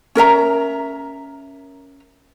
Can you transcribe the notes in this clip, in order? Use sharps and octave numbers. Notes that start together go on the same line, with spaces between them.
C#4 A#4 E5 A#5